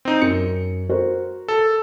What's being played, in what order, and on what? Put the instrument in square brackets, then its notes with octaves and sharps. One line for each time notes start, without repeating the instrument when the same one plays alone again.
[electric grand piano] C4 D#4
[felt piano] F#2 [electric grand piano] C#7
[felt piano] F#4 A#4 C5
[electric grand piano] A4